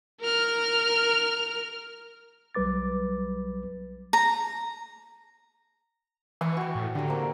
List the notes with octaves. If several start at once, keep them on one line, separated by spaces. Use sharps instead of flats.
A#4 F6
B1 F#3 G3 B4 D6 A6
A#5
E3 F5 G#5 C#6
F#4 G5
A2
D3 G4 A#5
A#3 C4